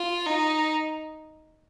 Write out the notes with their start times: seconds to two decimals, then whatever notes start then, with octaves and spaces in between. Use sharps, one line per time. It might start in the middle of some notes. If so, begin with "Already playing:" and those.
Already playing: F4
0.26 D#4